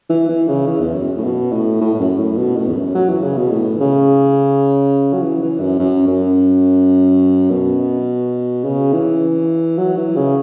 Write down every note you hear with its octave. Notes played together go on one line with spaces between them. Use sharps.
E3
E3
C#3
E3
E2
F#2
A2
B2
A2
A2
A2
F#2
A2
B2
A2
E2
F#2
F#3
E3
C#3
B2
A2
E3
C#3
F#3
E3
E3
F#2
F#2
F#2
B2
C#3
E3
F#3
E3
C#3